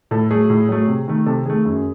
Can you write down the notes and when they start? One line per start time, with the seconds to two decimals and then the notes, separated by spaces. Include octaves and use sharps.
0.11 A2 A4
0.31 F#3 A3 G#4
0.50 A2
0.69 F#3 A3
0.87 C3
1.08 D#3 A3
1.26 C3 A4
1.46 D#3 A3 G#4
1.65 F#2